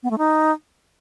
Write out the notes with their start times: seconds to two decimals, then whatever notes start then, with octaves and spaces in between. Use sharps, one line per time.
0.03 B3
0.11 A3
0.18 D#4